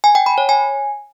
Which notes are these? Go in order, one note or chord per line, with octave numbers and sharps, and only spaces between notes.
G#5
G5
B5
C#5
G#5